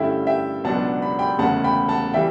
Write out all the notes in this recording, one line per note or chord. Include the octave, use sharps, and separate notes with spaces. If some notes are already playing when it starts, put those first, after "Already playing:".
Already playing: G2 D3 A3 C#4 E4 E5 G5
E5 G5
C#2 B2 F#3 B3 D4 F#5 A5
B5
G5 B5
E1 D2 C#3 F#5 A5
G5 B5
F#5 A5
E3 G3 E5 G5